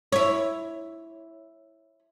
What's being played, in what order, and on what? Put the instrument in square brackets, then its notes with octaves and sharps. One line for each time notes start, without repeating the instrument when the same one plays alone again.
[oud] E4 C#5